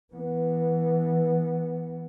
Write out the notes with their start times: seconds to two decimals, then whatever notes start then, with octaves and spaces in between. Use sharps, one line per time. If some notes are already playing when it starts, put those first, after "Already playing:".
0.14 E3 B3